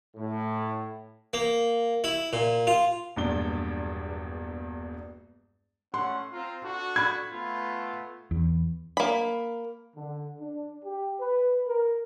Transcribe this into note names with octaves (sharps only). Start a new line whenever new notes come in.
A2
A#3
E4
A#2
F4
E1 A#1 E2 G2 D4 G7
A3 C#4 F#5 C6
C4 F4 A#5
D4 F#4 A4
B5 G#6
A3 B3 F4
E2
A#3 B5
D3
D4
G4
B4
A#4